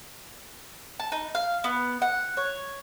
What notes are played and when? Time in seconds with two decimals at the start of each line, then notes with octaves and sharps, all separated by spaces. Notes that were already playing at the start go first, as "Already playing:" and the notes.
1.00 A5
1.12 D#4
1.35 F5
1.64 B3
2.02 F#5
2.37 C#5